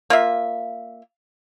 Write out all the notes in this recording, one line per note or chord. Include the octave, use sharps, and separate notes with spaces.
A#3 F4 E5